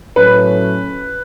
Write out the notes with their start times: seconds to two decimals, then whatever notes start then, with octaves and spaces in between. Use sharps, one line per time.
0.16 A2 F#3 A3 C#4 B4